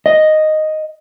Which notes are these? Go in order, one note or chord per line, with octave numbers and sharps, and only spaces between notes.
D#5